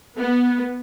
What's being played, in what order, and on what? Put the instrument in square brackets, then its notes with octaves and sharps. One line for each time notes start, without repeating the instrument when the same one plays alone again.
[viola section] B3